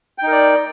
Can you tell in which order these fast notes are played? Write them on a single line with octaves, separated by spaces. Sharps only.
G5 D#4 A#4 D5